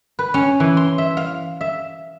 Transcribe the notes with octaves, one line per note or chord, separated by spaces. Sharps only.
B4
C#4
E3
C6
E5
F5
E5